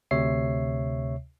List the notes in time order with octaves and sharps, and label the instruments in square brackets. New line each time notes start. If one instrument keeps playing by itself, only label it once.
[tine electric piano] D2 C3 C#5 E5 C7